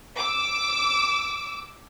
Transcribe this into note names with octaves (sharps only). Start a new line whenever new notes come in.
D6 E6